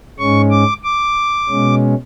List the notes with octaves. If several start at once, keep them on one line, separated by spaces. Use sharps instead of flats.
G#2 G#3 C#4 C#6
D6
D6
B2 G#3 C#4